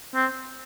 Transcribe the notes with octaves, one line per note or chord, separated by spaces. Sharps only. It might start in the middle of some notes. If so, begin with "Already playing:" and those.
C4